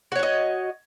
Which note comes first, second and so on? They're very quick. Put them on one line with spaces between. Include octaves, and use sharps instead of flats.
F#4 C#5 F#5 D#5